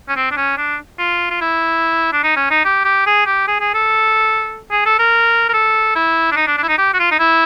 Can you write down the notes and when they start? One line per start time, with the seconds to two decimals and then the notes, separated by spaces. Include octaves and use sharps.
0.08 C#4
0.16 C4
0.31 D4
0.37 C#4
0.57 D4
0.99 F4
1.30 F4
1.41 E4
2.12 D4
2.23 D#4
2.36 C#4
2.50 D#4
2.65 G4
2.85 G4
3.06 G#4
3.26 G4
3.48 G#4
3.60 G#4
3.74 A4
4.71 G#4
4.86 A4
4.99 A#4
5.49 A#4
5.53 A4
5.95 E4
6.31 D4
6.36 D#4
6.47 D4
6.57 D4
6.63 E4
6.68 D#4
6.78 G4
6.94 F#4
6.99 F4
7.11 D#4
7.19 E4